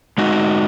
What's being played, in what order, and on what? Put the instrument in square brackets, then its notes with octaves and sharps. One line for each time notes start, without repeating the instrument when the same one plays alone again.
[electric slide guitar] G#3 D#4 F#4